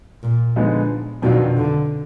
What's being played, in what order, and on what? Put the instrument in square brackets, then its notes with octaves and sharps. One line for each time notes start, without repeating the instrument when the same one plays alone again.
[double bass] A#2
[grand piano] D3 F3 G#3 B3 D#4
[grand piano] F2 D#3 F#3 D4 F4 [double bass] B2
[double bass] D3